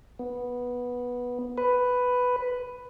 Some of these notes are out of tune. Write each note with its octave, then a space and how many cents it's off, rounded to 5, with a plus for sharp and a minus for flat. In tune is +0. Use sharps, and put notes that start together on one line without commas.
B3 -10
B4 +5